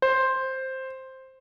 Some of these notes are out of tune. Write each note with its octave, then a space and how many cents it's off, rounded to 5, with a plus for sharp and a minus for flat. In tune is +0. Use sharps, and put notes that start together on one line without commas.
C5 +5